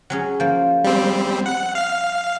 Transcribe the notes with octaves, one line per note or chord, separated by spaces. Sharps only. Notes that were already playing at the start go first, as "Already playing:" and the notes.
F#3 C#4 G#4
F3 A#3
G3 C4
F#5
F5